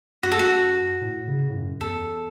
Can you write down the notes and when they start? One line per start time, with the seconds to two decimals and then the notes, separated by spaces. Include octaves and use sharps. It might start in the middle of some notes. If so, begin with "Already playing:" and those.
0.23 F#2 F#4
0.32 A4
0.39 F#4
1.01 A2
1.28 C#3
1.49 A2
1.55 F#2
1.81 E2 A4